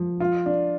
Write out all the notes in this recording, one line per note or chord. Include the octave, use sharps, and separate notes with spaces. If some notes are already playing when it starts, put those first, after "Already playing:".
Already playing: F3
F4
D4